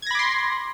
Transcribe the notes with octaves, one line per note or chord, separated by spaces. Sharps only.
B5 C6 D6 G#6 A#6